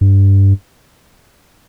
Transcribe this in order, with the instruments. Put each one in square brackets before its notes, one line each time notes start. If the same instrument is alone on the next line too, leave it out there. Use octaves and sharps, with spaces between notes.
[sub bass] G2